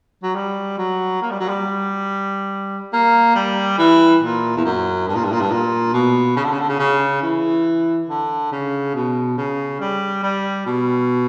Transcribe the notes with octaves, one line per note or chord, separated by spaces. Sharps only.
F#3
G3
F#3
A#3
G3
F#3
G3
A#3
G3
E3
A#2
E2
F#2
G2
A#2
G2
A#2
G2
A#2
B2
C#3
D3
C#3
D3
C#3
C#3
E3
D3
C#3
B2
C#3
G3
G3
B2